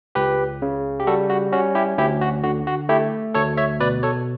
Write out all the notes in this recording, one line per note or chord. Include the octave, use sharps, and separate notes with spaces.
C#2 G4 B4
C#3
G4
G3 F#4 A4
F#4
C#4 F#4
E4 G4
D2 E4 G4
F#4
D3 F#4
F#4
A3 E4 G4
D2 A4 C#5
C#5 E5
B2 B4 D5
A4 C#5